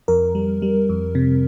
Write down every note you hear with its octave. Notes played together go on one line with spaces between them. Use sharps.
F2 A#4
G3
G3
F2
C3